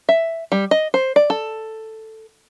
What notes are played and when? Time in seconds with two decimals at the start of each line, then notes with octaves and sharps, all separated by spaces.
0.09 E5
0.52 G3
0.71 D#5
0.94 C5
1.16 D5
1.30 A4